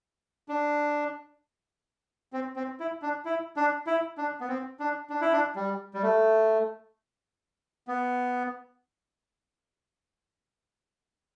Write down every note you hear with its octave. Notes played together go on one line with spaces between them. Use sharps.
D4
C4
C4
E4
D4
E4
D4
E4
D4
B3
C4
D4
D4
E4
D4
G3
G3
A3
B3